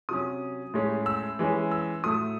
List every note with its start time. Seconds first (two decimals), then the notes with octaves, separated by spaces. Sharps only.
0.09 C3 F#3 C#4 D#6
0.74 A2 G#3 C#4
1.06 E6
1.39 E3 G#3 C#4
1.71 E6
2.04 A2 F#3 A3 D#6